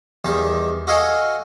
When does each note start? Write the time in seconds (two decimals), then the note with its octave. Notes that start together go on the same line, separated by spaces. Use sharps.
0.25 E2 D#3 G3 A5
0.87 F#4 A4 D#5 F5 G#5 C#6